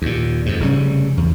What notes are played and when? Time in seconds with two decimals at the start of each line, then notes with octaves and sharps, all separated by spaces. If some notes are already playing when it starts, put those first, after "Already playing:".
0.02 D#2 A#2
0.46 F2 G#2
0.60 F1 C#3 G3 C#4
1.17 E2